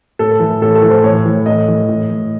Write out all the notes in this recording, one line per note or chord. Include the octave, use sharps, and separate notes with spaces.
A2 A4
E3
A2 A4
A4
E3
C5
A2 C#5
E3
A2 D#5
E3
A2
E3